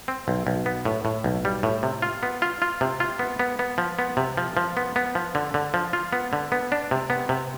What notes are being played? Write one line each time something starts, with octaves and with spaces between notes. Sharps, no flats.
C4
B1
B1
B3
A2
A2
B1
G3
A2
C3
F4
B3
F4
F4
C3
F4
B3
B3
B3
F3
B3
C3
F3
F3
B3
B3
F3
D3
D3
F3
F4
B3
D3
B3
D4
C3
B3
C3